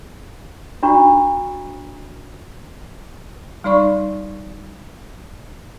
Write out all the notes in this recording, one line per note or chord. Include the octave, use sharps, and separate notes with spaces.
D4 F#4 A#5 B5 C#6
G3 D#4 D5 B5 C#6